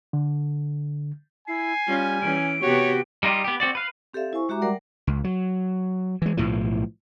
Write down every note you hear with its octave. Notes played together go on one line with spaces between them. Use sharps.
D3
E4 G#5 C7
G3 C#4 F4
E3 C#4 D7
C3 B3 F#4 G4 C#5
G3 D#4 F4 G4
B3 G4
C4 F#4 D5
B4 F5
C4 G4 A4 D5 E5 F5
E4 C5 G#5 C#6
G#3 F#4 G4 E5 A#5 D6
G3 A#4 D5 F#5
C#2
F#3
E3 G#3
B1 A2 E3 F3